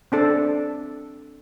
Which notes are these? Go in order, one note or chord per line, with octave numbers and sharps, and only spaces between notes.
C4 D4 A4